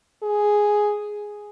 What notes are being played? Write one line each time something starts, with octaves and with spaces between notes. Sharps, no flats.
G#4